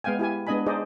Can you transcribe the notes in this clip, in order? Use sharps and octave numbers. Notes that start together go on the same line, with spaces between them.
G#3 B3 F5 G5 G#5
E4 G4 G#5
G#3 B3 D4 D#5 G#5 B5
D#4 G#4 C5 D5 D#5